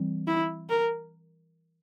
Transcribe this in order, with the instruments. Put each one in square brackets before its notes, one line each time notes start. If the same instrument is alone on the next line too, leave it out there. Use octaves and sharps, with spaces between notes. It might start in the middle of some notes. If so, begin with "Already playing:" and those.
Already playing: [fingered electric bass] E3 G3 C4
[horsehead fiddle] E4
A#4